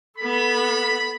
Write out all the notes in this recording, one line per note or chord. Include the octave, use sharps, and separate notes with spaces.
B3 A4 B5